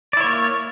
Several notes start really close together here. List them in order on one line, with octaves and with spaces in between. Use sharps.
D5 E4 C#5 A#3